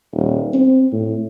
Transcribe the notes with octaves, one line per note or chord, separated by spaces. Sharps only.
D#1
C4
A2